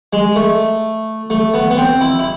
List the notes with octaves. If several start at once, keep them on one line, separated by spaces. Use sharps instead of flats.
G#3
A3
A3
B3
B3
C4
E4
E4